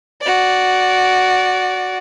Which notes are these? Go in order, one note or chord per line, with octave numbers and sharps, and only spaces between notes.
F#4 D5